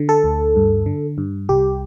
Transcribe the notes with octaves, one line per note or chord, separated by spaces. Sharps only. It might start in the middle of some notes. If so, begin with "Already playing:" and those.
Already playing: D3
A4
D2
G2
D3
G2
C2 G4